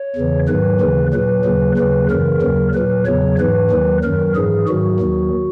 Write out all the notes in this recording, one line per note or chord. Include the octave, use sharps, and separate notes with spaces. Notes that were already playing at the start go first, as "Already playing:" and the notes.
Already playing: C#5
E2 C#3 E3
G#2 D#3 F#3 B4
D#2 C#3 E3
A#2 F#3 B4
D#2 C#3 F#3
D#2 C#3 F#3 B4
F#2 C#3 E3 A#4
D#2 C#3 F#3
A#2 F#3 B4
E2 C#3 F#3 C#5
G#2 E3 B4
D#2 D#3 F#3
F#2 D#3 F#3 A#4
G#2 E3 G#4
G#2 D#3 F#3 F#4
D#2 D#3 F#3